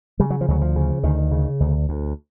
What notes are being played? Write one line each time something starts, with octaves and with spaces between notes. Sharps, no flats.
C#3 G3
F#3
F3
D2 F#3
F3
C#3
D2 D#3
C#3
D2
D2